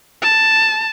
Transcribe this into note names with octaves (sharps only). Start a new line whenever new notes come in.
A5